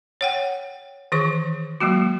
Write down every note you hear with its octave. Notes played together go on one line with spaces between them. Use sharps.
C#5 F#5 G5
D#3 E3 G#4 C#6
F#3 G#3 A#3 F#4